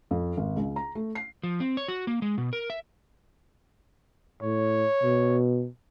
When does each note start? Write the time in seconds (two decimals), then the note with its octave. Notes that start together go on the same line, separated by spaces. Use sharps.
0.11 F2
0.37 G#1
0.56 C#2
0.76 A#5
0.95 A3
1.15 C7
1.43 F3
1.60 C4
1.77 C#5
1.88 F#4
2.07 A#3
2.22 G#3
2.38 B2
2.53 A#4
2.70 E5
4.43 A2 C#5
5.03 B2